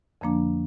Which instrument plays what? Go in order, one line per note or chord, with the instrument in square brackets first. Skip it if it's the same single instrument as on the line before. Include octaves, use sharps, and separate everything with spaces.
[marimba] F2 D3 F3 A#3 D4